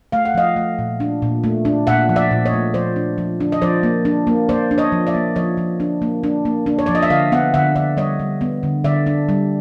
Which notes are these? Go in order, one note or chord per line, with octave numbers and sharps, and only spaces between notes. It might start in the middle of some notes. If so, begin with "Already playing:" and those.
A3 F5
F#5
F3 D#5 F5
A3
A#2
D4
A#2
A3
D4
A#2 E5 F#5
F3
D5 E5
A#2
C#5 D#5
A3
F3 C5 D5
D4
F3
D4
D#5
F3 C5 D5
A#3
D4
A#3
A#3 C5 D5
D4
C#5 D#5
F3
D5 E5
A#3
F3 C#5 D#5
F3
D4
A#3
D4
A#3
D4
C#5
F3 D5
D#5
E5
D3 D#5 F5
B3 E5 F#5
D3 E5 F#5
D3 D5 E5
G3 C#5 D#5
G3
B3
D3
D3 D5 E5
D4
G3